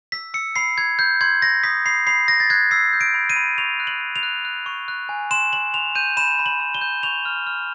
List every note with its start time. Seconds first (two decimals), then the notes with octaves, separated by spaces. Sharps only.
0.12 E6 B6
0.34 E6 C#7
0.56 B5 C7
0.78 B5 G#6
0.99 G6
1.21 C6 G#6
1.42 C6 A#6
1.63 D#6 B6
1.86 B5 C7
2.07 B5 C7
2.28 B5 A#6
2.40 A6
2.50 F#6 G#6
2.71 E6 C7
2.93 G6
3.01 D7
3.14 B5
3.30 D#7
3.36 B5
3.58 C#6 F7
3.80 F#6
3.87 F#7
4.01 F#6
4.16 F7
4.23 F#6
4.45 F#6
4.66 C#6
4.88 F#6
5.09 G#5
5.31 C6 E7
5.53 C6 F#7
5.74 C6 F7
5.95 G6 D#7
6.17 B5 E7
6.39 B5
6.46 F#7
6.60 B5
6.75 G7
6.81 G6
7.03 C#6 F7
7.25 F6
7.47 F6